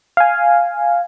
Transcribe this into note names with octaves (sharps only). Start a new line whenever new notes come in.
F5 G#5